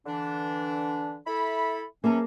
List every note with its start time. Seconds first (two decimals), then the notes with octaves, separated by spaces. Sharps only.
0.06 D3 E3 D4
1.26 E4 A4 B5
2.04 E3 F#3 A#3 C#4 G#4 A5